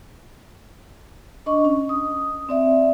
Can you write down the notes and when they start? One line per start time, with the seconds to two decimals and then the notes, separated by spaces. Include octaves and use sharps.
1.46 D4 D#5 C#6
1.65 C#4
1.89 D#6
2.49 C4 D5 E5